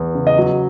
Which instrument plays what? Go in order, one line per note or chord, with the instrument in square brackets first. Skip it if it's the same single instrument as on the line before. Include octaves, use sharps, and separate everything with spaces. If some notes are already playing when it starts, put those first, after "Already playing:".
Already playing: [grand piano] E2
C#3
[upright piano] D#5
[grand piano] F#3